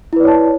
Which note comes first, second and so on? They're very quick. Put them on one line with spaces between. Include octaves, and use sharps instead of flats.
E4 B4 D5 C#5 A5